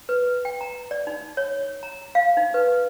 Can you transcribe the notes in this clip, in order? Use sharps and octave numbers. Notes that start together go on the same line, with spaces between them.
B4
G5
A#5
D5
D#4
C#5
A#5
F5
D#4
B4